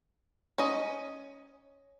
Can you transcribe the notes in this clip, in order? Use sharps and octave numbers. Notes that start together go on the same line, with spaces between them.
C#4 D#5